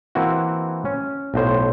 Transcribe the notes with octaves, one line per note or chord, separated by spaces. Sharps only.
E3 A#3 C4 E4 F#4
C#4
B1 A2 C5